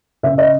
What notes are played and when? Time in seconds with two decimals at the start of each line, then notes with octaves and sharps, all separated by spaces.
0.23 C#3 E5
0.38 D#5